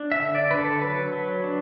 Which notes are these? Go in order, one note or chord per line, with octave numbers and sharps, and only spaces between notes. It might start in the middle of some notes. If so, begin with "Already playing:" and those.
Already playing: D4
E5
D3
D5
D3 B4
A4
F#3 B4
F#3
D4